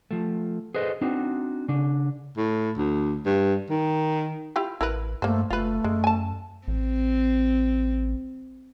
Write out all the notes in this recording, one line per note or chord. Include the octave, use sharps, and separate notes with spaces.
F3 A3
G#4 A4 B4 C5 D#5
C4 D4 D#4 F#4
C#3 D4
A2
D2
G2
D#3
E4 F4 G4
A1 E4 A#4 B4
G2 A3 A#3 C5
F#1 A3 F4 B4
F#2 G#3
G#5 A5
A1 C4